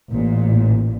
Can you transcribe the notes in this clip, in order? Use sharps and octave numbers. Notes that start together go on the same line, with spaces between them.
A1 A#2